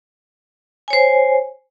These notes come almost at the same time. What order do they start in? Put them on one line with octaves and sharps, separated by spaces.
G#5 C#5 C5